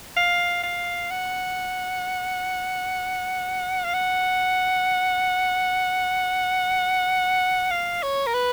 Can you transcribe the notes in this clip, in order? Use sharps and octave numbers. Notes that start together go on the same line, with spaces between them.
F5
F5
F#5
F5
F#5
F5
C#5
A#4
B4